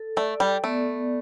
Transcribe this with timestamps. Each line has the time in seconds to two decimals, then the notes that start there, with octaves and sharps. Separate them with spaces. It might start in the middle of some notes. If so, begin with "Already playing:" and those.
Already playing: A4
0.17 A3 D5
0.40 G3
0.64 A3 B3